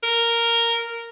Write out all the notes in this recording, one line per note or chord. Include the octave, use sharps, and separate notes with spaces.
A#4